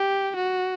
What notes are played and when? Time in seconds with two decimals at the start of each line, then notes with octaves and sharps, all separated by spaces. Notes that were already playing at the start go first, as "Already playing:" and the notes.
Already playing: G4
0.36 F#4